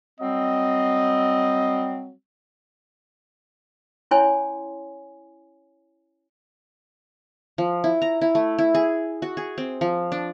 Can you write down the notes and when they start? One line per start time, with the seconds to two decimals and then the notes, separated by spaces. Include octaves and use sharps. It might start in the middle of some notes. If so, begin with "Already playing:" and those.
0.20 F#3 G3 C4 D#5
4.11 C#4 E4 C#5 G#5 C6
7.58 F3
7.84 E4
8.02 A#5
8.21 E4
8.35 A3
8.59 E4
8.75 G#4
9.22 F#4
9.37 G#4
9.58 C4
9.81 F3
10.12 D4